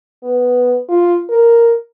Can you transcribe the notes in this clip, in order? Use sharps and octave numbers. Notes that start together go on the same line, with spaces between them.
B3
F4
A#4